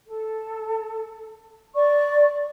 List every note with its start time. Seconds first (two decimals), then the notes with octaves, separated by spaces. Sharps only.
0.07 A4
1.74 D5 C#6